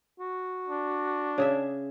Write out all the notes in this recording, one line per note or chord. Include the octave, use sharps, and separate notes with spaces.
F#4
D4
C#3 G#4 E5